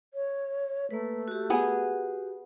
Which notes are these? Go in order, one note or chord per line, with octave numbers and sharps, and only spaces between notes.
C#5
A3 A#3 B4
F#4 G4
B3 G#4